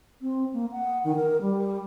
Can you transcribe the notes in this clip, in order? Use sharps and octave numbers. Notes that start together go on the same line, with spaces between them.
C4
A#3
F#5
D#3
A#4
G3